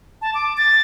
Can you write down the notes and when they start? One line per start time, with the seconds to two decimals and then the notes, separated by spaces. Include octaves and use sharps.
0.22 A5
0.34 D6
0.57 A6